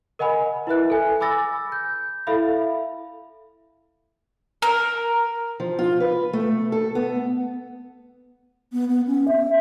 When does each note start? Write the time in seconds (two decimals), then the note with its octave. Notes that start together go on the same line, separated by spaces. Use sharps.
0.19 A#4 D#5 F#5 G#5 B5
0.67 E4 B4 E5 F#6
0.90 A4 G#5
1.20 G#5 B5 D6 E6 A6 A#6
1.72 G6
2.27 E4 A4 E5 F5 B5
4.62 A#4
5.60 F3
5.79 F4
6.00 B4
6.33 A3
6.72 A4
6.95 B3
8.73 B3
8.88 B3
9.07 C#4
9.28 E5